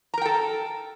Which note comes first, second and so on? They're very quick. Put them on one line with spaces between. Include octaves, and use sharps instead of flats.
A#5 A#4 G5 A4